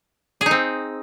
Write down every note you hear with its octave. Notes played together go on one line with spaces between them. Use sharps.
G#4
D#4
C4